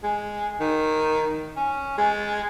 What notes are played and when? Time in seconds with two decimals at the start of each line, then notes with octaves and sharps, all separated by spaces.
0.03 G#3
0.60 D#3
1.57 C#4
1.98 G#3